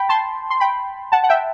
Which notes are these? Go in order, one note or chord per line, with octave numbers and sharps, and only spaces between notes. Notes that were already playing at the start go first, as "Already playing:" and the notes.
Already playing: G5 B5
A5 C6
C6
G5 B5
F#5 A5
F#5
E5 G5